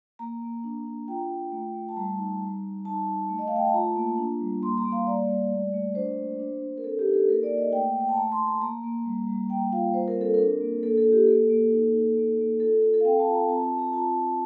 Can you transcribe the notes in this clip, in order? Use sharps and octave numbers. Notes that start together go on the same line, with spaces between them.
A#3 A#5
A#3
D4
D4
F4 G5
F4
A3
A3
A5
G3 A#5
D#4
G3
G3
D#4 A5
D#4
A3
D#5
F5
A3 G5
A5
F4 A#5
A#3
D4
G3
A#3 C6
A#5
A#3
F5
G3 D5
G3
A3
A3
D4 C5
A#3
D4
D4
A#4
C4 A4
G4
D#4
A4
A#3 A#4
D5
A#3
D#5
A3 G5
A3
G5
A5
A3 A#5
C6
A3
A#5
A#3 A#5
A#3
G3
G3
A#3 G5
F4 F5
G3 C5
A#4
C4 A4
D4 A#4
A#3
A#3 A4
A4
F4
G4
A#3 A4
A#3
D#4
D#4
A#3
A#3
F4 A4
F4 A4
A4
F5
C4 G5
A5
F4
A#5
C4 A5
A5
A#5
C4
A#5
F4 A5
F4